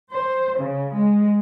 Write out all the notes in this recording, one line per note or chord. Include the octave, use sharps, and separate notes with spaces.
C5
C#3
G#3